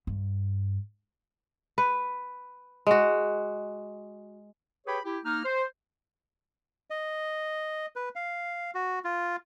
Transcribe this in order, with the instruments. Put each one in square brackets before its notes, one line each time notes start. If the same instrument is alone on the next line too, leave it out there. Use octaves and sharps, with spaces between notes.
[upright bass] G2
[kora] B4
G#3 F#4
[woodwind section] G4 G#4 B4 C#5 G5 B5
E4 G4
A#3 D#4 F6
C5
[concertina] D#5
B4
F5
F#4
F4